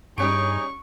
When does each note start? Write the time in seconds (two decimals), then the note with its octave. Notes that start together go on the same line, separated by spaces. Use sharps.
0.18 G2 G3 C#4 D#4 G#4 C#6 D7